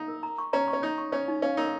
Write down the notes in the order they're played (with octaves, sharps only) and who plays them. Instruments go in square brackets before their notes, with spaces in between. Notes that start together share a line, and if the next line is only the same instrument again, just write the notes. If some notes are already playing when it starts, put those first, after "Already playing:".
Already playing: [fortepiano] D#4
[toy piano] A#4
A#5
C#6
[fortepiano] C#4 [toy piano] A#5
[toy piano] C#6
[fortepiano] C#4
[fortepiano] D#4 [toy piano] C#5
[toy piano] C#6
[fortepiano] C#4 [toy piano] C#5
[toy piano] D#4
[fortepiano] C#4 [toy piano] F5
[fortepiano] D#4 [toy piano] A#4